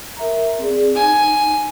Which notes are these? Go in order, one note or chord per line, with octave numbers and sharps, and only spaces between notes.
A#4 E5 A#5
C4 G#4 D5
D#4 G#5